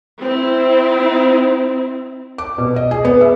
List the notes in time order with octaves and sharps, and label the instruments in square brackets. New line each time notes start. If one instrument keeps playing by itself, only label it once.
[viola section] C4 E4
[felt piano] D6
B2
D#5
G#4
B3
E5